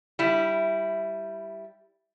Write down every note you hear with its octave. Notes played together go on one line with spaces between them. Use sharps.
G3 E4